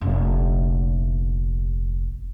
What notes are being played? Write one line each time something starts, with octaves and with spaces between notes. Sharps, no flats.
F1 A#1